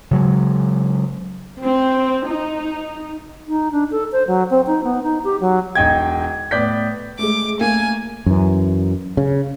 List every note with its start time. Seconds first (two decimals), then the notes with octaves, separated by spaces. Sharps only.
0.11 C#3 F#3 G#3
1.62 C4
2.26 D#4
3.48 D#4
3.72 D4
3.91 A4
4.12 C5
4.28 F#3
4.50 C4
4.67 D#4
4.84 B3
5.03 D#4
5.24 G4
5.41 F#3
5.75 E1 D#4 D#5 G5 G#6
6.51 A2 B3 D5 G6 B6
7.19 G#3 A3 D6
7.61 A3 A#3 G#5
8.26 F#2 E3
9.17 C#3